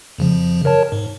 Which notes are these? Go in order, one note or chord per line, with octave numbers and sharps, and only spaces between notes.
F2 C#3 F3
A#4 C#5 A5
G#2